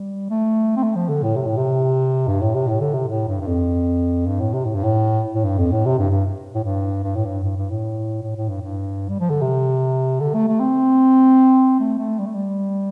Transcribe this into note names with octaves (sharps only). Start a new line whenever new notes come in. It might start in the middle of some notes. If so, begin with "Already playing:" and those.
Already playing: G3
A3
C4
A3
F3
D3
A2
C3
A2
C3
G2
A2
C3
A2
D3
C3
A2
G2
G2
F2
G2
A2
C3
A2
G2
A2
A2
G2
F2
A2
C3
G2
G2
A2
G2
G2
A2
G2
G2
G2
A2
A2
A2
G2
G2
G3
F3
D3
C3
D3
A3
A3
C4
A3
A3
G3
A3
G3